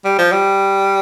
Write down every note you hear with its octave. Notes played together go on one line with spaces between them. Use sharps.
G3
F3
G3